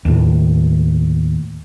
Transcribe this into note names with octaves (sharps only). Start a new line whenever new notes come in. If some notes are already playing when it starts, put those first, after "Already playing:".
D#2 A2